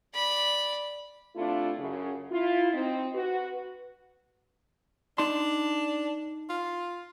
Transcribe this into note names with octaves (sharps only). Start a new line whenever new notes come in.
D5 B5
C3 A3 D4 E4 F4
F#2 C#3
E4 F4
C4 D#4
F#4 B4
D4 D#4 C6
F4